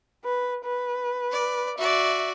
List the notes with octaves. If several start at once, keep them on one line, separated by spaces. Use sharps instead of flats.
B4
B4
D5
F#4 D5 E5